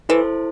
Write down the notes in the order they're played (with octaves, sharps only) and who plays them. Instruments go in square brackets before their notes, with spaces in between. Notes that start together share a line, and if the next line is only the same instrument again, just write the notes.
[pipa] E3 [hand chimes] E4 A4 C5